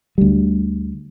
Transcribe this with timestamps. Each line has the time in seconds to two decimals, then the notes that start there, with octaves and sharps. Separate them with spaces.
0.18 D2 G3